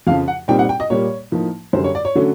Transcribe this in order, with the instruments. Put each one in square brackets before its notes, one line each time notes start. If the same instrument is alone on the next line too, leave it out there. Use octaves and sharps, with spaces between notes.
[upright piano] F2 C#3 F3 F5
F#5
A#2 G3 C4 D#4 G5
F#5
G5
D#5
A#2 G3 A#3 C#5
A2 F3 A#3 D#4
F#2 D3 G3 C5
C#5
D5
C#5
D3 F#3 A3 C#4